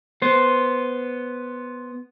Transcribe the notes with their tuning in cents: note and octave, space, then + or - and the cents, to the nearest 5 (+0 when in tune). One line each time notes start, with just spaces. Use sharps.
B3 +0 C5 +0